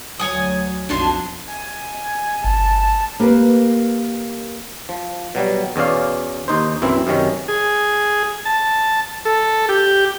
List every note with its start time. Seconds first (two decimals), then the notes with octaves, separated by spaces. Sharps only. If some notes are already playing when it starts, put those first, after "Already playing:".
0.20 D2 F#3 C#5 G#5 D#6
0.89 B1 F2 F3 F#3 D4 D#4 A5 C6
1.49 G#5
2.44 G1 A5
3.20 A#3 G4 A#4 B4
4.89 F3
5.35 B2 F#3 G3
5.76 E2 B2 C#4 D5 F5
6.48 D#2 D#4 C5
6.82 B1 F#2 E3 C4 E4
7.07 F#2 C3 D#3 C#4
7.48 G#4
8.45 A5
9.25 A4
9.69 G4